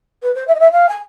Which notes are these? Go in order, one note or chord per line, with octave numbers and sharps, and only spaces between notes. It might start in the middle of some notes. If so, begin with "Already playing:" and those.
B4
C5
E5
D#5
E5
F5
G#5